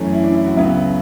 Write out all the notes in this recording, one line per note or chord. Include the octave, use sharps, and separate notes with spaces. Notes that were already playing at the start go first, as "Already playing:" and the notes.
Already playing: F#2 E3 A3 C#4
E4
D4
E4
F#4
C#2 C#3 F#3 B3 E5